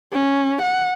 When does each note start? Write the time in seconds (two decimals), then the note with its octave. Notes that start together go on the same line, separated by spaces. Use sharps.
0.13 C#4
0.62 F#5